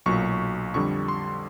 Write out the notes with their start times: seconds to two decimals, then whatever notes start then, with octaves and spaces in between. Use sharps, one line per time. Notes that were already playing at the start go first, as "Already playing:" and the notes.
0.06 B1 A#2 F#3 C#6
0.74 F2 D3 G3 C#6
1.08 C6